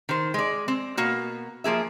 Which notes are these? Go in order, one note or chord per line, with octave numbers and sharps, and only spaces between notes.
D#3 C5
G#3 D5
C4
B2 A#3 F#4
F3 A#3 G#4 E5